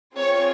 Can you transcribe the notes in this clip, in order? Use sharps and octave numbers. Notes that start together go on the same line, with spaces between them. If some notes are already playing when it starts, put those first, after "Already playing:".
C4 F4 G#4 C#5